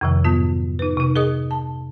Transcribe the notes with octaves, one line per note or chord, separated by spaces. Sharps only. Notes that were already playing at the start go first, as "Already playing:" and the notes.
F2 A2 C3 D#3 F3
G#2 F#3 B3 F4
D#4 B4
C3 D#4
G#4 A#4 D#5 D#6
A5